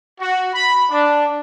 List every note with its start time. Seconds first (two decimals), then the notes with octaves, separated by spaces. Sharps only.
0.20 F#4
0.54 B5
0.90 D4